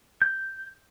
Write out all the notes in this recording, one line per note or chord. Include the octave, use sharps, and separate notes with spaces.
G6